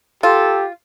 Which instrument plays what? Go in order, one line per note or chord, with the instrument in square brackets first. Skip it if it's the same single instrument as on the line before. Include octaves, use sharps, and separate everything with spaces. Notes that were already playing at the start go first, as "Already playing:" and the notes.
[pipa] F4 [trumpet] G4 [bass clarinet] A4